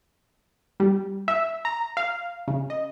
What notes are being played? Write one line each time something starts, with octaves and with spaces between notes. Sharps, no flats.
G3
E5
A#5
F5
C#3
D#5